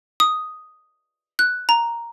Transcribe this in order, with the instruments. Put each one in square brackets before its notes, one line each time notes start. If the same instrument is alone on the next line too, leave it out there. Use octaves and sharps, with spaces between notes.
[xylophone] D#6
F#6
A#5